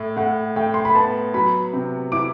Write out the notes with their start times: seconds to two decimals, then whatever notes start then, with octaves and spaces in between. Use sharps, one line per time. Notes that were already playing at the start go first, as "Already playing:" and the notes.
Already playing: A2
0.16 A2 F#5
0.56 A2 G5
0.74 C6
0.85 B5
0.95 B3 A5
1.34 F#3 B5
1.73 C3
2.12 E4 D6